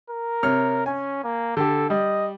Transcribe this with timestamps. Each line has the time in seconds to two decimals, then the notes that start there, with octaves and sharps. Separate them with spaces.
0.10 A#4
0.43 C3 C#5 F6
0.86 C#4 G#5
1.24 A#3
1.57 D3 G4 A4
1.90 G3 D#5